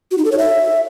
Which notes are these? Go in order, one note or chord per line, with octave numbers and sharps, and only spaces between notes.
F#4
D#4
A4
C#5
E5